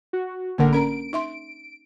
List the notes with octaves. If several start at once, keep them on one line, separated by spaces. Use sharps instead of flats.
F#4
A1 D3 A#3 D4 A#4 F#5
C#4 A#4 A#5 D7
D#4 E5 C6